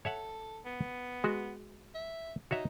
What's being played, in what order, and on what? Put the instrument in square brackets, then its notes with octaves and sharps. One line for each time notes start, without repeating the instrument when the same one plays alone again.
[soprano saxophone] A4 [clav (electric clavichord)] C#5 E5 F#5
[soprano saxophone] B3
[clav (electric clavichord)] G#3 F#4
[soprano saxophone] E5
[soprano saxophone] D#4 [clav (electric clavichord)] F#4 C#5 E5